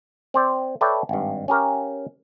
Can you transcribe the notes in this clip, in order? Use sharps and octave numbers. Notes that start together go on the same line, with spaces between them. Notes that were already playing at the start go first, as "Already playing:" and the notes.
C4 C5 D5
A4 B4 C#5 D5 E5 G5
G#1 G2
C#4 G4 A#4 F5